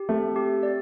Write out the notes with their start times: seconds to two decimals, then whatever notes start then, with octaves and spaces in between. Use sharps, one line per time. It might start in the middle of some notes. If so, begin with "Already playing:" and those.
Already playing: G4
0.09 A3 C4
0.36 G4
0.63 D5